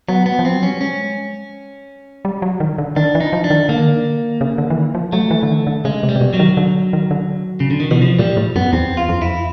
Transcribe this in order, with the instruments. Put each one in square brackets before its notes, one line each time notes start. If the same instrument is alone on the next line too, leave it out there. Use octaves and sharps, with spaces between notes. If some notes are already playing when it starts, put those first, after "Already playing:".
[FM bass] F#3 [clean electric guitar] B3
[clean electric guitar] B3
[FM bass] F3
[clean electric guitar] C4
[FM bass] F#3
[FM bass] G3 [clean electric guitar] C#4
[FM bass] G#3 [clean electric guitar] C#4
[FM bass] G3
F#3
D#3
D3
[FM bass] D#3 [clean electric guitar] D4
[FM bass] E3
[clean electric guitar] D#4
[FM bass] F3
[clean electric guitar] D4
[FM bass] D#3
[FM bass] D3 [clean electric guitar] A#3
[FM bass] D#3
D3
C#3
D3
E3
D#3
F3
[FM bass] F#3 [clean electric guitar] A3
[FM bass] E3
D3
D#3
D3
[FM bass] C#3 [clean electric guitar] G#3
[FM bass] C3
[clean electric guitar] G3
[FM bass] C3
B2
[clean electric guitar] F#3
[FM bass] D#3
D3
D#3
D3
[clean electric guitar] C#3
D3
D#3
[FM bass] B2 [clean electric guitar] E3
[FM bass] C3 [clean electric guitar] F3
[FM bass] A#2 [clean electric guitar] G3
[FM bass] A2
[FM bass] F#2 [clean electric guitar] B3
[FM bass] E2 [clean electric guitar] C4
[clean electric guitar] F4
[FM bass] F2
E2
[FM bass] F2 [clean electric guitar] E4